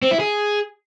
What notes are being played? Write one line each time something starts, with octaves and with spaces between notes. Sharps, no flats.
C4
E4
G#4